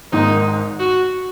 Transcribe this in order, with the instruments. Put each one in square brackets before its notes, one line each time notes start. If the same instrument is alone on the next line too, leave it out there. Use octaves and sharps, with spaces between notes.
[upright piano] G#1 G#2 D#3 [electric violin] D#4
[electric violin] F#4